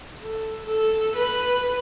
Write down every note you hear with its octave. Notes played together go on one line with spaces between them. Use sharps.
A4
A4
B4